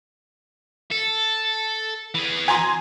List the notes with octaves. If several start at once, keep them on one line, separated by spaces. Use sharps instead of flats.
A4
E3 G#4
G#5 A#5 C6